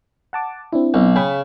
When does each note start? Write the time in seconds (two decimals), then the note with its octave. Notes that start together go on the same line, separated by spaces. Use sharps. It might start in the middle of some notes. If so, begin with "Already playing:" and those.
0.33 F#5 A5 D6
0.73 C4 D4 E4
0.94 B1
1.16 C#3 G5 B5